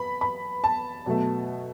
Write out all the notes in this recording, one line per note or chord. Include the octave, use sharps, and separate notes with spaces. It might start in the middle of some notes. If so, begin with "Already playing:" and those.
Already playing: B3 B5
B5
A5
B2 F#3 A3